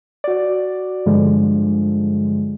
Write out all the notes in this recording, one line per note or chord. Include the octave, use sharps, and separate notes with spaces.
F#4 D5
G2 D3 F3 G#3